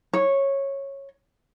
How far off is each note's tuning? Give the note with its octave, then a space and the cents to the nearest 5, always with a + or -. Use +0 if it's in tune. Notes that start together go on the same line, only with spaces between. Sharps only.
C#5 -10